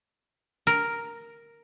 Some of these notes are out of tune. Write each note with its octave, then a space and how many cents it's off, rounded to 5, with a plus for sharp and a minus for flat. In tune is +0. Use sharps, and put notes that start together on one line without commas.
A#4 +0